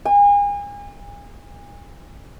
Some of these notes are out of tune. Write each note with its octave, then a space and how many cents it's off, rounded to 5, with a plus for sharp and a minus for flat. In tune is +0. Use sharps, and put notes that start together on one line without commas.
G#5 -35